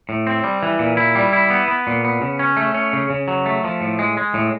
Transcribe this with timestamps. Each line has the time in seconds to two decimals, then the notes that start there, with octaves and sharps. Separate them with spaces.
0.09 A2
0.27 C4
0.44 G3
0.63 E3
0.79 A#2
0.97 E4
1.15 G3
1.33 E4
1.50 B3
1.68 B3
1.87 A#2
2.05 B3
2.21 C#3
2.39 C#4
2.57 A3
2.74 C#4
2.93 C#3
3.10 C#3
3.28 F#3
3.46 A3
3.64 F3
3.82 A2
3.99 G#3
4.17 G#3
4.34 A2